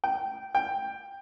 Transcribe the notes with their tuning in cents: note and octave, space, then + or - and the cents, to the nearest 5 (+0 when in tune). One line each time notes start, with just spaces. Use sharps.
G5 -10
G5 +10